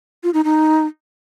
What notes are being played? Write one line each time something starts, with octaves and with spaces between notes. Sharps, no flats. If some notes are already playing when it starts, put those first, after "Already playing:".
F4
D#4
D#4